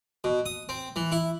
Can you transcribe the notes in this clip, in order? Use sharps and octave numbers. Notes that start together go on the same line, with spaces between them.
B2
D#6
C4
E3
E4